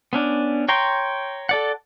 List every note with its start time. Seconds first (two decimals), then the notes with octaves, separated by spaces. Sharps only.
0.13 B3 C#4 D4
0.69 C#5 G5 A#5 C6
1.49 A4 D5 F#5